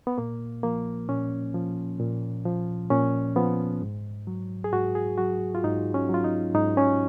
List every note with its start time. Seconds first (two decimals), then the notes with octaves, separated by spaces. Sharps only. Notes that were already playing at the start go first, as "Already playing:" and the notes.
0.07 B3
0.18 A#2 A#3
0.63 F3 A#3
1.09 A#2 C#4
1.54 F3
1.99 A#2
2.46 F3
2.90 A#2 C#4
3.36 F3 B3
3.82 G#2
4.27 F#3
4.64 G#4
4.73 G#2 F#4
4.95 G#4
5.18 F#3 F#4
5.55 F4
5.64 G#2 D#4
5.94 C#4
6.09 F#3 F4
6.24 D#4
6.54 G#2 D#4
6.77 C#4